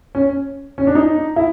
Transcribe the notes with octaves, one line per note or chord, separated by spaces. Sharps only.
C#4
C#4
D4
D#4
E4